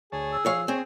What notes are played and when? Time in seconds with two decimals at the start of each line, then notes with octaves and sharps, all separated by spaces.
0.12 D2 G#4 C#5 A5
0.33 E6
0.46 F3 G#4 C#5 F5
0.68 C4 G#4 C#5 G#5